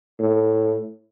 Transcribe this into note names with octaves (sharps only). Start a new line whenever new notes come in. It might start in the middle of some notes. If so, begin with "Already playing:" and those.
A2